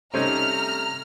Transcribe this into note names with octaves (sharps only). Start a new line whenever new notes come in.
C3 G3 A3 C4 C#4 D#4 A#5 F6